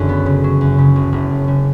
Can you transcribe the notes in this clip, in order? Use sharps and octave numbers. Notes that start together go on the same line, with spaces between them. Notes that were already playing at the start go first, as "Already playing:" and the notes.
Already playing: F#1 F#2 D3 F#3
B3
C#3
F#3
F#2
C#3
F#1
F#1
F#2
C#3